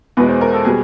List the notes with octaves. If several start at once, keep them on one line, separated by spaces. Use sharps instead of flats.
E2 B2 G#3 B4
C5
A#4
A4
B2 G3 G#4